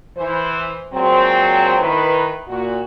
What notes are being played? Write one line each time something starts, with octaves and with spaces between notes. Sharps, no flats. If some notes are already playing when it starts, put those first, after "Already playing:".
E3 C5
A#2 F#3 G#3 C4
D#3 E4 B4
A#2 F#4